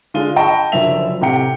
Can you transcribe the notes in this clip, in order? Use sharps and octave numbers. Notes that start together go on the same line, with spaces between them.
D3 G#3 F4 D#7 G7
D#5 G5 A5 B5 C#6
F#1 D3 F3 F#3 E5 F7
A2 C3 G4 F#5 G5 C#7